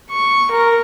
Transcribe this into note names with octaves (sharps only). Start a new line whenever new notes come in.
C#6
A#4